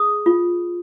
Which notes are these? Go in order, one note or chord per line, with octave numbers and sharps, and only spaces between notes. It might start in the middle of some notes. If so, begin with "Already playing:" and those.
Already playing: G#4 D#6
F4